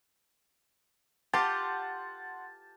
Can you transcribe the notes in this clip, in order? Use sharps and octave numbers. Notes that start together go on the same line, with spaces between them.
F4 G4 F#5 A5 C6 G6